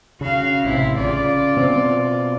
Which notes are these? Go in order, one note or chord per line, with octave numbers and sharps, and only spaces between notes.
C#3 F#4 F5
A1 C3 E4
C#3 F4 D5
B2 C4